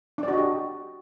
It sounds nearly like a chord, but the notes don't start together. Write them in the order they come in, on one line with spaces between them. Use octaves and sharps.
D4 D5 F#4 D#5 G4